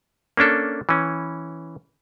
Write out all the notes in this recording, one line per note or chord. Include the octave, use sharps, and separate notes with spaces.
A#3 C#4 D4 A4
E3 C#4